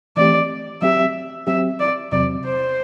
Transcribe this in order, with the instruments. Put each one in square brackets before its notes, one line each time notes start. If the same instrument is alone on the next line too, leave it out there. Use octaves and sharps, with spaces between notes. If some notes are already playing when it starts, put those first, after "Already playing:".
[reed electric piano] E3 A3 C4 G4 [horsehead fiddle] D5
[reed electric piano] F#3 C4 G4 [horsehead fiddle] E5
[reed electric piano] F#3 C4 G4 [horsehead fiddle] E5
[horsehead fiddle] D5
[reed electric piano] E2 C3 F#3 C4 [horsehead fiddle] D5
[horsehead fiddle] C5